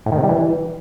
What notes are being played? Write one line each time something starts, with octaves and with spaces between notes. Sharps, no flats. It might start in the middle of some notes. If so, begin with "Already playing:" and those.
A2
D#3
C3
G3
E3